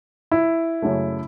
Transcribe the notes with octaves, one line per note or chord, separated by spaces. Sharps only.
E4
F#2 C#3 F#3 A3